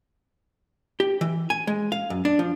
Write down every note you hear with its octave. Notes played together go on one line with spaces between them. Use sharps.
G4
E3
G#5
G#3
F5
F#2
D4
F3